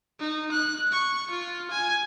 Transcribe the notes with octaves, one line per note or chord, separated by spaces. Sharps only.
D#4
F#6
C#6
F4
G#5